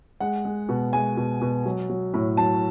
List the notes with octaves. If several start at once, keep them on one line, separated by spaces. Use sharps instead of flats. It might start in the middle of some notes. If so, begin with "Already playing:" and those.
G#3 F#5
G#3
B2
G#3 G#5
B2
B2
F#3
F#3
A2
F#3 A5